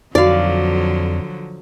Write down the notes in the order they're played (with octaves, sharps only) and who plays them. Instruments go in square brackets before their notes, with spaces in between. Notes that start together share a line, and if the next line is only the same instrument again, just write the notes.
[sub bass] F2 [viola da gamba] D3 F3 F#3 [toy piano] D#4 F#4 [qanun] D5 F5